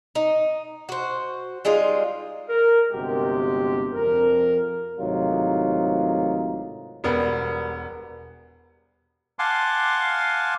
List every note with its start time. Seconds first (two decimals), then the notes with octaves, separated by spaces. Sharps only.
0.15 D#4
0.89 F#4 C5
1.65 G3 G#3 D#4 F4
2.49 A#4
2.92 G1 C3 G#3 F#4 G4
3.93 F2 A#4
4.99 G#1 A2 C3 F#3 D#4 F4
7.04 E1 G3 B3 A#4 C5
9.39 F5 F#5 G#5 A5 C6 D6